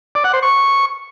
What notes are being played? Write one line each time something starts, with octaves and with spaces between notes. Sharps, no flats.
D5
F#5
C5
C#6